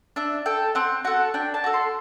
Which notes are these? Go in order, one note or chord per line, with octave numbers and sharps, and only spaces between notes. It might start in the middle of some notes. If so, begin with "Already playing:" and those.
D4 E5
A4 G5
C4 F#5
F#4 A4 F#5
D4 G5
A5
F#4 A4
C6